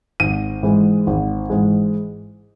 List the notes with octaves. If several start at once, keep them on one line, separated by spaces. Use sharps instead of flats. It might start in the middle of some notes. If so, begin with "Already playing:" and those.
G#1 D#7
G#2 E3 G#3
G#1
G#2 E3 G#3